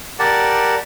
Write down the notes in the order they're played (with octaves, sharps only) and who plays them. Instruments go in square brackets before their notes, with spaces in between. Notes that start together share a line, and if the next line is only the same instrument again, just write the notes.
[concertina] G4 A#4 D5 F#5 A5